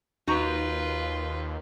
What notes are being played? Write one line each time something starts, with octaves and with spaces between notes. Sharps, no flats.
D#2 D#4 F4 F#4 B4 A#5